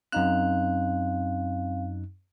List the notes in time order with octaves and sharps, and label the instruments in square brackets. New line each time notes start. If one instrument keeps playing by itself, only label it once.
[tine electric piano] F#2 D#4 F#6 [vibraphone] C4 F5